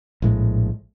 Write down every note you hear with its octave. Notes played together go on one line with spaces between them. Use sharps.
A#1 A2 G#3